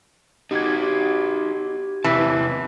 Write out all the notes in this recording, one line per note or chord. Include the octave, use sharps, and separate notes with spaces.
D#4 F#4 G4 G#6
E2 C3 E3 A5